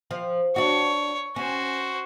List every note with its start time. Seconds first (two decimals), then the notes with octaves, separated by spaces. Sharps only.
0.11 F3
0.56 D4 F#4 C#5
1.36 C#4 F#4 C5